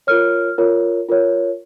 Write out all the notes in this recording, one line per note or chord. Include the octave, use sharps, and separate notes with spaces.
F4 A#4 C#5 F6
F4 A#4 C#5
F4 A#4 C#5